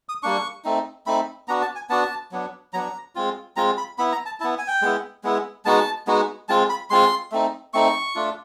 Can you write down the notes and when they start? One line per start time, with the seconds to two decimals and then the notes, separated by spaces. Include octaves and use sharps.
0.09 D#6
0.23 G3 A#3 D4 C#6
0.64 A3 C4 D#4
1.06 A3 C4 D#4 B5
1.48 B3 D4 F#4 A#5
1.62 A5
1.75 G#5
1.90 B3 D4 F#4 A5
2.31 F#3 B3 D4
2.73 F#3 B3 D4 A#5
3.15 G#3 C4 F4
3.56 G#3 C4 F4 A#5
3.78 B5
3.98 B3 E4 B5
4.12 A#5
4.26 A5
4.40 E4 A5
4.44 B3
4.58 G#5
4.68 G5
4.82 G#3 B3 E4
5.24 G#3 B3 E4
5.65 G#3 B3 D#4 F#4 A5
6.07 G#3 B3 D#4 F#4
6.49 G#3 C4 F4 A5
6.69 B5
6.90 G#3 C4 F4 C6
7.32 A3 C4 D#4
7.74 A3 C4 D#4 C#6
8.15 A3 D4 F4